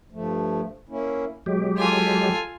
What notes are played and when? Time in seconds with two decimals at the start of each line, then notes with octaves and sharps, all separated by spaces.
0.12 G2 F3 A3
0.89 A#3 C#4 E4
1.46 B2 F#3 G#3 G4
1.78 F4 A4 G#5